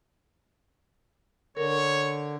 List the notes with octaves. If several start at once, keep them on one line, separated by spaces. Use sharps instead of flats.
D3 A#4 C#5